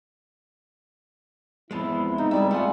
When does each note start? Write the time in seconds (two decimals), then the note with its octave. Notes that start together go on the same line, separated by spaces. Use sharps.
1.71 E2 F3 G#3 B3 C4 E4 A5
2.18 C#3 D#4
2.31 G3 G#4 D5 E5
2.51 A3 F4 F#5 G#5